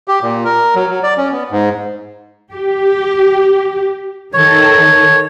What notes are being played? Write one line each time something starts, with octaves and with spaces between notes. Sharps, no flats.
G4
A#2
A#4
F#3
F#3
D5
C#4
B3
G#2
G4
D#3 A4 C#5